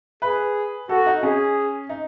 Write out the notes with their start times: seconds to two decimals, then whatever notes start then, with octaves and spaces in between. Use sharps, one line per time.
0.22 G#4 B4
0.89 F#4 A4
1.06 D#4
1.22 C#4 G#4
1.89 D#4